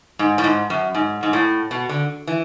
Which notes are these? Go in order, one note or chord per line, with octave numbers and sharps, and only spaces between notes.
G#2
A2
G#2
F#2
G#2
G#2
A2
B2
D3
E3